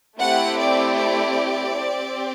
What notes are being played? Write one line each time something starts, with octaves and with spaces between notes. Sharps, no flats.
A3 C4 E4 G4 F#5
D5
D5
C4 G4